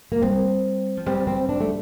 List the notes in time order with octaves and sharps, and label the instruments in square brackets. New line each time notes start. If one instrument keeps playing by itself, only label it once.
[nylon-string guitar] A#3
[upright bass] G3 [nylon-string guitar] C4
[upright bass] F3
[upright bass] G3 [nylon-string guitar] C4
[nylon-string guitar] C4
D4
A3